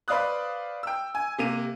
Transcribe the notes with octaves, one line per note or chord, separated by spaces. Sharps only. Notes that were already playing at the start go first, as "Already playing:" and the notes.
B4 C5 D5 F5 D#6 F#6
G5 E6
G#5
C3 A#3 D#7